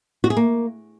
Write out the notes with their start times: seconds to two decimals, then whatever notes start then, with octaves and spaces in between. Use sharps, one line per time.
0.24 F#4
0.30 G#4
0.37 A#3